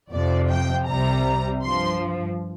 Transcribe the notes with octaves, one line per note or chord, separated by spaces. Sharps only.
F2 C3 F3 D5
G5
C2 C3 G3 A#5
G2 F3 C6